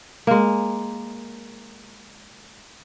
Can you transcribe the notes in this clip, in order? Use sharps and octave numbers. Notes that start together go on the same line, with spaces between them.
G#3 A#3